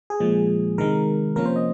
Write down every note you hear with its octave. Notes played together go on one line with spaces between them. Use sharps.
G#4
A#2 F3 G#3
C3 D#3 G#3 A#4
C3 F3 A#3 C#4 A#4
C5
D#5